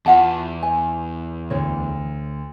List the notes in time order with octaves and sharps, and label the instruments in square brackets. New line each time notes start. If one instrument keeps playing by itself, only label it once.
[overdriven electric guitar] E2 [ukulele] F4 F#5 A5
[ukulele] G#5
[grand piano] D2 [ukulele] C#5